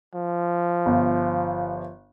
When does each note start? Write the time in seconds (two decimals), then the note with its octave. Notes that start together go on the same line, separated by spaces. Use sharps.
0.15 F3
0.86 G1